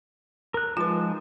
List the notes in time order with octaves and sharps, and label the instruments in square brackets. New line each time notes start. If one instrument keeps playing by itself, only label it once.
[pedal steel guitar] A#4 F#6
[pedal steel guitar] F3 G#3 D#4 [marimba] F4 B4